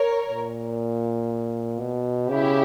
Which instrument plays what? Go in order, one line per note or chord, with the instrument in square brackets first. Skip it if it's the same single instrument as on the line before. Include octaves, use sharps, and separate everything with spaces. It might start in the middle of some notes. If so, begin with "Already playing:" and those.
Already playing: [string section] A#4 C#5
[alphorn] A#2
B2
[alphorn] C#3 [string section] E4 G4